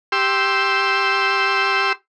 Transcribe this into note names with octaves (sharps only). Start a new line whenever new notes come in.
G4 C6 E6